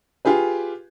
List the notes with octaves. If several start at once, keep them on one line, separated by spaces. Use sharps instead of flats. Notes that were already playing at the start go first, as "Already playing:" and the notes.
F4 G4 G#4 B4